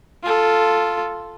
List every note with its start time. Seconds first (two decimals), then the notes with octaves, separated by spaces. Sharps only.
0.23 F4 A4